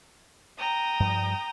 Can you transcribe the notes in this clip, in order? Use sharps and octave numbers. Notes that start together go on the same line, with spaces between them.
G5 A#5 D#6
G2 F3 G3